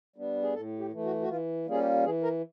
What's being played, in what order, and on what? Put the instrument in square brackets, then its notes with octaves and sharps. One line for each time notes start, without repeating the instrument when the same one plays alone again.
[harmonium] G3 B3 D4
G#4
A2 A4
G4
E3 A3
F#4
F#4
E3 F4
G3 A#3 C#4 F4 G#4
G4
E3 G#4
A#4